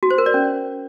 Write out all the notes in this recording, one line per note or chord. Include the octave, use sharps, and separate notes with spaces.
F#4
C5
A#4
D5
C#4